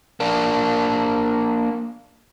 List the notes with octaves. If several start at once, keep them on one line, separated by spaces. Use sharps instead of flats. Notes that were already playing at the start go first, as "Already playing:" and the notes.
A#3 D4